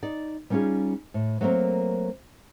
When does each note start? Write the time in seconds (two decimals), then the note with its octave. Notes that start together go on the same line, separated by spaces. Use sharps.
0.03 D#4 D5
0.50 G3 B3 C#4 D#4 F4 G#4
1.14 A2
1.41 F#3 A3 A#3 C4 A#4